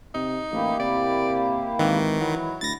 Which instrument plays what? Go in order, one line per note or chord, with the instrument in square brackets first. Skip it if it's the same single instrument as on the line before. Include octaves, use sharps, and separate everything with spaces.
[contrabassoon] C3 [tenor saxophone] D#4
[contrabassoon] A1 [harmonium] A#3 E4 G4
[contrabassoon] C3 [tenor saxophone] D5
[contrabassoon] G#1 [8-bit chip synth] D#3 [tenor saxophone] E3
[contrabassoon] E3 [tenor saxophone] F#3 [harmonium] E4
[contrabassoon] D2 [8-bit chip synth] A6 A#6